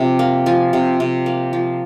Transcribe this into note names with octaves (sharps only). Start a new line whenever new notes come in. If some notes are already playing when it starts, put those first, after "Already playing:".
Already playing: C3 F3
A#3
F3 G#5
C3
C3
A#3
F3